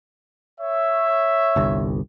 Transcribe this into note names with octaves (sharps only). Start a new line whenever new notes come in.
C#5 E5
G1 C2